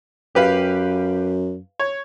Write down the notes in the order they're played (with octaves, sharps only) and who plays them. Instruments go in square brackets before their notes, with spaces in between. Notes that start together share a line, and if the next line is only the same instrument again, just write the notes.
[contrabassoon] F#2 [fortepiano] G4 B4 F5
[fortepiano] C#5